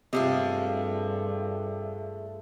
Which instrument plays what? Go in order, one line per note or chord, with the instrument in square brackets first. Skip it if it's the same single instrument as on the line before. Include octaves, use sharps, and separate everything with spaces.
[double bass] G2 [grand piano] C3 [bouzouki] G#3 A3 F4